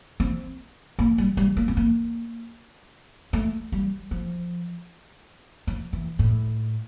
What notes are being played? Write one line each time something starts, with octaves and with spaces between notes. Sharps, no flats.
C4
A#3
G3
G3
A#3
C4
A#3
A3
G3
F3
F3
E3
A2